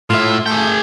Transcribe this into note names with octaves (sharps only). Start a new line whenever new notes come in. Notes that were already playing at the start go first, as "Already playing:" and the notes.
A2 F4 E5
A3 G#4 G5